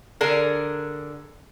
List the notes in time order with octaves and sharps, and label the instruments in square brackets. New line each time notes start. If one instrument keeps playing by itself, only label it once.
[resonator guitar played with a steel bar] D3 D4 G#4 A#4